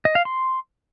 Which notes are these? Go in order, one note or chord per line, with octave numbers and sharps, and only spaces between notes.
D#5
F5
C6